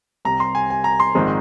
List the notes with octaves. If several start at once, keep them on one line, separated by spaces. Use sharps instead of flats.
C2 C3 G3 A#5
C6
G#5
G#5
A#5
C6
A#1 G#2 D#3 G#3 C4